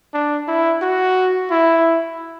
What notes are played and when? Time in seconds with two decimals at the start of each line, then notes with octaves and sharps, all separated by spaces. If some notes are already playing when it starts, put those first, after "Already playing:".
0.14 D4
0.48 E4
0.82 F#4
1.51 E4